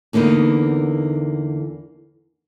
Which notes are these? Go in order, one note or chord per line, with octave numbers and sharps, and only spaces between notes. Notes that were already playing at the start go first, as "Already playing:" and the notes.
E2 D3 A#3 B3 D#4